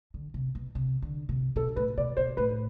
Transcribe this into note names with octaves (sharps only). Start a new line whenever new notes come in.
D3
C3
B2
C3
D3
C3
B2 A4
A2 B4
B2 D5
B2 C5
A2 B4